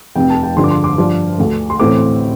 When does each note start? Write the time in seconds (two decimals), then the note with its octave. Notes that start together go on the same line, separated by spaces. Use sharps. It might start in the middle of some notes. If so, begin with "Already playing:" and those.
0.16 F1 F2 C3 G5
0.30 A5
0.43 G5
0.56 G2 D3 F3 D4 C6
0.64 D6
0.71 C6
0.84 D6
0.98 G2 F3 D4
1.38 D2 D3 A3
1.70 C6
1.80 A1 A2 A3 C4 D6